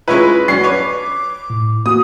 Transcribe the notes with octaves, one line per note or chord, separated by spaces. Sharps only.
G#3 C#4 E4 F4 B4
F#2 D5 C7
B4 C#5 D6
A2
A#3 F#4 D#6